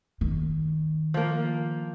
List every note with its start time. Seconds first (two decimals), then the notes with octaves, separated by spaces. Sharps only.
0.21 D#3
1.14 F3 A#3